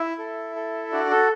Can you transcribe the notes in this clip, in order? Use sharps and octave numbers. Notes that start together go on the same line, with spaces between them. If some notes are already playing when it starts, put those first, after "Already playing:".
Already playing: E4 E5
A4
A4
D4 F#4 D5
A4